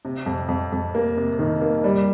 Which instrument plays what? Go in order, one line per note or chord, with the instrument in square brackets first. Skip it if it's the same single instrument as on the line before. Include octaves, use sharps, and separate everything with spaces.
[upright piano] C3
F2
F2
F2
A#3
C3
D#3
A#3
G3